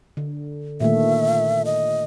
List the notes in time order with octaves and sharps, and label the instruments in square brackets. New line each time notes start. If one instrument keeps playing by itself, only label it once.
[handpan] D3
[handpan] A#2 D#3 A3 [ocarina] E5
[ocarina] D#5